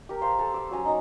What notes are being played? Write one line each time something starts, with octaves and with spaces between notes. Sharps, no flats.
G4 A#4
C5 F5 A5
A4 A5
D6 E6
F#3 C#4 G#5 A#5
D#4 A#5